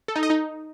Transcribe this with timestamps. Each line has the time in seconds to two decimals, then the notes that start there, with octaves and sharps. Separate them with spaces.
0.08 A4
0.16 D#4
0.23 D#5
0.30 D#4